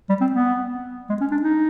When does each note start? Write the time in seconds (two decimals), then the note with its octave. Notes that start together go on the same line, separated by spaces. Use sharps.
0.09 G3
0.21 C4
0.32 B3
1.09 G#3
1.21 C#4
1.31 D4
1.42 D#4